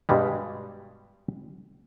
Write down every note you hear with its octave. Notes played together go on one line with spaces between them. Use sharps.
G2 B2 G3 G#3